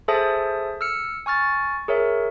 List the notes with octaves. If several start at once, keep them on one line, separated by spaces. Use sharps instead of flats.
G#4 A4 C5 E5 A5 D#6
E6 F6 C#7
G#5 C#6 F6 A6
G#4 A#4 C#5 E5